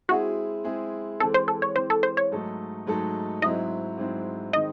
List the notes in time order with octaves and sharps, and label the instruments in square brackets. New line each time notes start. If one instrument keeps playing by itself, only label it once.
[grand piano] G#3 C4 E4 G#4 [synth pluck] F#4
[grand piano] G#3 C4 E4 G#4
[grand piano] E3 G#3 C4 [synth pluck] A4
[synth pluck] C5
A4
C#5
[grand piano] E3 G#3 C4 [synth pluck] C5
[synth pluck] A4
C5
C#5
[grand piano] G#2 F#3 A3 D#4 A4
G#2 F#3 A3 D#4 A4
[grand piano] G#2 F#3 C4 E4 [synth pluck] D#5
[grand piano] G#2 F#3 C4 E4
[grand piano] D#3 G#3 C4 D#4 [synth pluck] D#5